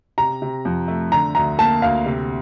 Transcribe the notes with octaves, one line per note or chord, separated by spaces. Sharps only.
C3 A#5
C3
F2
A3
D3 A#5
D2 A#5
A#3 A5
D2 F5
C3